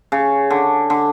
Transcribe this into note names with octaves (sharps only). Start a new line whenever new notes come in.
C#3
D3
D3